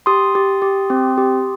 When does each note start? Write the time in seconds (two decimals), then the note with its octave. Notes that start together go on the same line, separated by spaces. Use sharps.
0.06 G4 C6 D#6
0.35 G4
0.62 G4
0.90 C4
1.18 G4